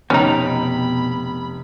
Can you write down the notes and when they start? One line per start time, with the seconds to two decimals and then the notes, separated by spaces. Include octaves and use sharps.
0.10 F1 B2 C#4 D#4 G5 A#5 B5